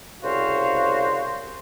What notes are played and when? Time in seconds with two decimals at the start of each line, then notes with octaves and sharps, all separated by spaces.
0.23 C2 C#3 F#4 C5 F5